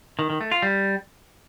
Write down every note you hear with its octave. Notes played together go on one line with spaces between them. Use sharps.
D#3
D#3
A3
F4
G3